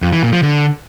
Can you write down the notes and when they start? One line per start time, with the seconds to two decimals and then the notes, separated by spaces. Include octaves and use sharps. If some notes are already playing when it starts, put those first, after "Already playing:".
0.02 F2
0.13 E3
0.23 A#2
0.33 F3
0.43 D3